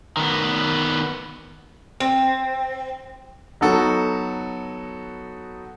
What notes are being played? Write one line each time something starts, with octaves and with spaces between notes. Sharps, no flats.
D#3 B3
C4
F#3 B3 D#4 F#4 A4